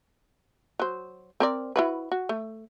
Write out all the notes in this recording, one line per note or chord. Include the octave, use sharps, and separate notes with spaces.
F#3 C5
C4 A#4 D5
E4 F#4 B4
F#4
A3